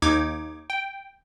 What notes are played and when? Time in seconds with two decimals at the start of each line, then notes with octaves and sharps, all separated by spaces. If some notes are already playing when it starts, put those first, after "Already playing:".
0.02 D#2 D#4 D6 G#6
0.70 G5